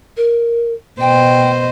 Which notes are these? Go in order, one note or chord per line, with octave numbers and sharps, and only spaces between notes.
A#4
B2 C5 D#5 G5